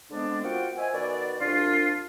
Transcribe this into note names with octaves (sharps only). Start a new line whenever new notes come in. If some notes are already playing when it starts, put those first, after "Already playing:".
G#2 D3 G#3 B3 C4 D4
F4 F#4 A#4 C5 F#5 G5
C5 D#5 E5 G#5
D#3 B3 F#4 D5
C2 D4 F4